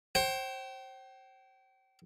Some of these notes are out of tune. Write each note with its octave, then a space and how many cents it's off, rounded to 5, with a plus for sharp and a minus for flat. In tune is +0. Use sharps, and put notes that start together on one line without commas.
C5 +30 G5 -35